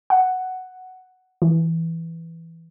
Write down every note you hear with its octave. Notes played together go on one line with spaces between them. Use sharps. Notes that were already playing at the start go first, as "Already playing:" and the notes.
F#5
E3